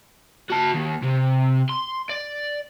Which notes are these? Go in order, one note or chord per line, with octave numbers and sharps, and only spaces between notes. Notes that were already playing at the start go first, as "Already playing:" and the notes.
F#4 A5
D#2
C3
C6
D5